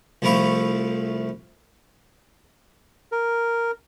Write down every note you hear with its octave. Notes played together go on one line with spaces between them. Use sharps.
C2 F3 A3 E4 F5 C#6
A#4